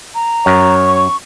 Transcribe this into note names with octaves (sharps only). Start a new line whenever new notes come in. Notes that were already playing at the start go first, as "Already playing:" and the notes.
A#5
F#2 C#5
C#6